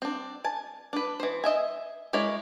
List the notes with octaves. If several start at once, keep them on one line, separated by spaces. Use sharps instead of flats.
C4 D4
G#5 A5
D4 B4
E3 C5
D#5 E5 G#5
G#3 E4 A#4 C#5 D5